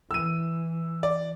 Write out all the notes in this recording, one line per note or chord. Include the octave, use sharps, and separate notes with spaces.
E3 E6 D#7
D5